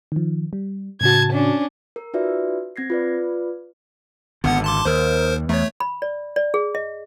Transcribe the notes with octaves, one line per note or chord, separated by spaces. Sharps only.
D#3 F3
G3
A2 C#3 F#4 A5 G#6
C#4 D4
A#4
D#4 F4 F#4 B4 D5 E5
C4 G#6 A#6 C7
F4 B4 D5
G#1 D3 B3 F#5
A5 C6 D6
D#2 A#4 C5
E2 A3 C#5
B5
D5
D5
G#4
D#5